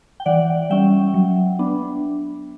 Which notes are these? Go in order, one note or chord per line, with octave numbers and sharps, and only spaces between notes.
G5
E3 D5 F#5
G3 C#4 E5 G5
F#3
B3 D4